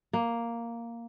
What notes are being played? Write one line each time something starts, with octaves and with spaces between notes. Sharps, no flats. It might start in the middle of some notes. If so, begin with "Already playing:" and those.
A#3